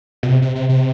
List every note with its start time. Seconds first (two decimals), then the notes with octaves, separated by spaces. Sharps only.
0.23 B2
0.28 C3
0.42 C3
0.55 C3
0.69 C3